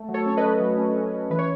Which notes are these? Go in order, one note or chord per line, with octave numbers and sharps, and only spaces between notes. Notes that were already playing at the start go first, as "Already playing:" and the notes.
Already playing: A3
F#3
A4 C#5
C#4 C#5
B4 D#5
A3
F#3
C#4
C#4
C#4
E3 B4
C#5